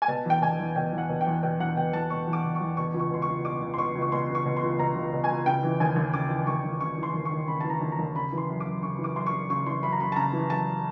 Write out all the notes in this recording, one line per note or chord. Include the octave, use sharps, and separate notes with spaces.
G#5
B2 A5
E2 G5
B2 G#5
E2
B2 G5
E2
F#5
B2
G5
E2
B2 G5
E2 F#5
B2 G5
E2 A5
B2 C#6
E2
D6
B2
C#6
E2
B2 C#6
C#2
C#6
B2 C6
C#6
C#2
B2 D6
C#2
C6
B2 C#6
C#2
C#6
B2 C6
C#2
C#6
B2
C6
C#2
B2 A#5
C#2
B2
G#5
C#2
C#3 G5
E3
D#2 G#5
D#2
C#3 D6
E3
D#2 C#6
D#2
C#3 C#6
E3
C6
D#2
C#6
D#2
C#3 B5
E3 A5
A#5
D#2
A#5
D#2
C#3 B5
E3
C6
F#2
D6
F#2
C#3 C#6
E3
D6
F#2 C6
C#6
F#2
C#3 C#6
E3 C6
F#2 B5
A#5
F#2 B5
A5
C#3 A#5
E3
F#2 A5